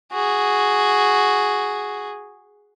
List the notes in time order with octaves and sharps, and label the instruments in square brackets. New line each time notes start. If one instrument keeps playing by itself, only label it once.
[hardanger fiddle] F#4 G#4